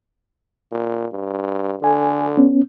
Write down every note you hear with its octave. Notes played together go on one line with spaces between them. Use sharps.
A#2
G2
D3 A4 G#5
B3 C#4